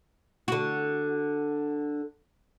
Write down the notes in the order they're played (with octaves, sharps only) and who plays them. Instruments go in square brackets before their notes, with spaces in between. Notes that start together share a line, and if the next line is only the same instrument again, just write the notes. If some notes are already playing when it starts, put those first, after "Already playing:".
[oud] D3 F#4